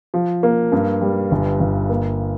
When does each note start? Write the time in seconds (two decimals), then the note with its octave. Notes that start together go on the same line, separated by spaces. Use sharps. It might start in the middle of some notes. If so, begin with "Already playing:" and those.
0.14 F3
0.43 A#3
0.72 G2
1.01 G3
1.31 G1
1.60 G1
1.89 A#3